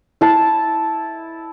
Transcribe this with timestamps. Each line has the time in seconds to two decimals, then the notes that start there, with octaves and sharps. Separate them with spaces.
0.21 E4 A5